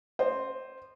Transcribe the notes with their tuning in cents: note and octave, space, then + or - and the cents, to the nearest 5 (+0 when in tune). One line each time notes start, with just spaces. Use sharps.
C5 +0 D#5 -35